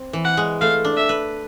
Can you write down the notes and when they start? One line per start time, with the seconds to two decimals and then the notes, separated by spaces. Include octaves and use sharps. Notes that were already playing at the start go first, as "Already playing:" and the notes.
Already playing: C4
0.13 E3
0.25 F#5
0.37 G#3
0.61 A3 F5
0.85 D4
0.97 E5
1.09 B4